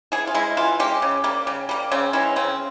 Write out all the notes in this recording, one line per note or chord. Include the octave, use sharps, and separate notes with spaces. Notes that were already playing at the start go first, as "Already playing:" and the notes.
E3 G#4
F4
G#3 E4
E3 F4
G#3 G4
C#3
G3 A#3
C#3
G3 A#3
C#3 C4
E3 G#3 C#4
C#3 C4